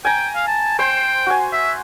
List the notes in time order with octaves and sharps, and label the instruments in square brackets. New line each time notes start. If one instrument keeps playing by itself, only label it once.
[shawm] G5 [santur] G#5 A#5
[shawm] F5
A5
[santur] C5 C6 [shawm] G5
[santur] F#4 G#5
[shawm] E5